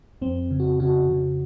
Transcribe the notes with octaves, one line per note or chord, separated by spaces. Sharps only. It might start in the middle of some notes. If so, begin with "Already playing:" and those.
F2 C4
C#3
F#4
C#3 F#4
C#3